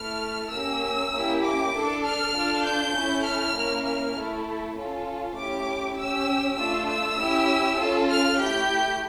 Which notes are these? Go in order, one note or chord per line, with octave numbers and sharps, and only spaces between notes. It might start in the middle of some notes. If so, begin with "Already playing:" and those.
Already playing: A3 E4 A4 F6
A#3 C#4 G4 E6
A#3 C#4 E4 G4
D6
D4 A4
F6
D4 F4 A4
G6
C#4 E4 A4
F6
A#3 C#4 E4
F6
A3 E4 A4
C#4 F4 A4
A3 C#4 E4 G4 D6
C#4 G4 E6
A3 D4 F4 E6
E6
C#4 E4 G4
C#4 F4 A4
F6
A3 E4 G4 G6